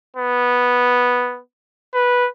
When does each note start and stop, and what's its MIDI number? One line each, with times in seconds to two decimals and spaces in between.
0.17 1.40 59
1.94 2.28 71